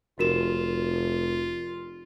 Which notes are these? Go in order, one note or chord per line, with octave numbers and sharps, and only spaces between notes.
F1 F4 F#4 A#4 E7